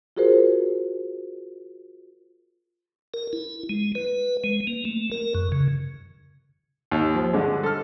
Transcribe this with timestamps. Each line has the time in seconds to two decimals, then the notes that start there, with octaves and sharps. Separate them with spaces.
0.17 F4 F#4 G#4 A#4 C5
3.14 A#4
3.33 E4
3.69 G#3
3.95 B4
4.44 G#3
4.67 A#3
4.85 A3
5.11 A#4
5.35 F#2
5.52 C#3
6.92 D#2
7.15 F3
7.33 G2 D3 G#3
7.63 A4 F6